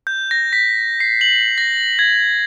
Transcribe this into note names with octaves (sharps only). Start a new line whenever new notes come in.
G6
A#6
B6
C7
F#7
A#6
G#6